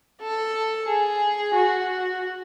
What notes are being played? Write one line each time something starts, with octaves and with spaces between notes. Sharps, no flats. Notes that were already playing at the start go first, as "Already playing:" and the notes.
A4
G#4
F#4